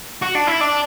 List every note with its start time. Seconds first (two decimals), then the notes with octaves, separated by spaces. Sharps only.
0.22 F#4
0.35 D4
0.47 E4
0.61 D4